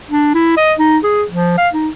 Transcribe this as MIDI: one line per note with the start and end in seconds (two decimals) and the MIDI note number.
0.09 0.31 62
0.34 0.53 64
0.57 0.73 75
0.79 0.98 63
1.03 1.24 68
1.30 1.57 53
1.57 1.68 77
1.74 1.89 63